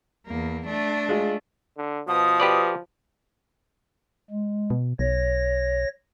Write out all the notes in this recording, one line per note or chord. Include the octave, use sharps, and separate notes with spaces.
E2 A#3
A3 D4
G#3 F4
D3
B2 F3 D#6
G4 B4 D5
G#3
B2
B1 C#5 A#6